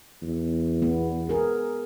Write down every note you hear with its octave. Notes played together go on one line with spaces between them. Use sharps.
E2
B3
G#4 A#4